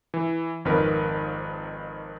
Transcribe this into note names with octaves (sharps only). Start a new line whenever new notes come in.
E3
G#1 F2 D#3 A#4 B4